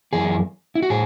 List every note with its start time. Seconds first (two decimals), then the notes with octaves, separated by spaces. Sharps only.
0.13 F#2 E3 G#4
0.75 E4
0.82 F#4
0.90 A2 G#4